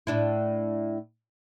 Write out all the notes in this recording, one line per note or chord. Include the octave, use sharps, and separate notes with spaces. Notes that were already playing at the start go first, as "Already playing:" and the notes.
A2 D4 E4